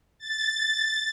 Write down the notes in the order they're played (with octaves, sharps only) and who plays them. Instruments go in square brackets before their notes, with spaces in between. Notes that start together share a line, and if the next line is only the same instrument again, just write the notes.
[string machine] A6